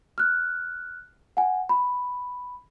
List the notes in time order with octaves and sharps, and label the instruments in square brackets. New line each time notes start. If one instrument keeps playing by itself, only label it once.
[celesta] F6 F#6
F#5 G#5
B5